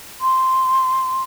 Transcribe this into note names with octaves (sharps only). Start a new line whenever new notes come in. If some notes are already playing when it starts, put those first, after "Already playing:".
C6